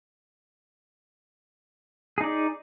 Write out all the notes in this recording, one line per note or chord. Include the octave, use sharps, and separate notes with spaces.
D#4 G#4 D5